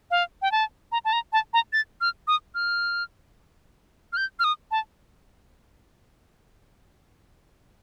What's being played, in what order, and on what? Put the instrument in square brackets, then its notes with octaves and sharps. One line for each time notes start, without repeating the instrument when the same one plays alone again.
[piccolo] F5
G5
A5
A#5
A5
A#5
A5
A#5
A6
F6
D#6
F6
F6
G6
F6
D#6
A5